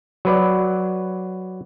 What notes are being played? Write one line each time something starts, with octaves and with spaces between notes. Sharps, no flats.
F#3 B4 D5